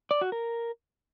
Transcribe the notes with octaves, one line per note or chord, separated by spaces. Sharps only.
D5
F#4
A#4